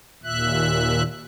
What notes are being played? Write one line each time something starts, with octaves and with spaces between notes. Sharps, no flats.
D#2 A#2 E5 F#6